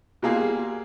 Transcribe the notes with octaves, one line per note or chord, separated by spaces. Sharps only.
B2 G3 A#3 F4 G#4